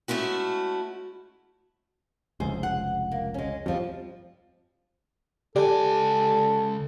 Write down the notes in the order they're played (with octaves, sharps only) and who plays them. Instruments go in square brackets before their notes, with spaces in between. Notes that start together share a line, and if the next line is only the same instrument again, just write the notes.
[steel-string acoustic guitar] G#3 A3 C#4 E4 F#4
[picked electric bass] F1 C#2 [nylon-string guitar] G#4 C5
[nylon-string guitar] F#5
A#3
G#3 C#4
[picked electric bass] F2 [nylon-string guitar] F3 G3
[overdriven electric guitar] C#2 G#5 [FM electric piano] G4 D5 [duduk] A4